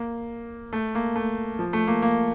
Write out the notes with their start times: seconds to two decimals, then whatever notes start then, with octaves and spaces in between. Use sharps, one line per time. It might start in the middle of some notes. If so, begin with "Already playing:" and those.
Already playing: A#3
0.73 A3
0.95 A#3
1.16 A3
1.59 F3
1.73 A3
1.87 A#3
2.02 A#3